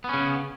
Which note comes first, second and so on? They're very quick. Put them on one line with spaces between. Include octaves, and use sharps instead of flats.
B3 C#4 C#3